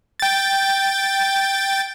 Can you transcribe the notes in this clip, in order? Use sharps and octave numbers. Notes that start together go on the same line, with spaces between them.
G5 A6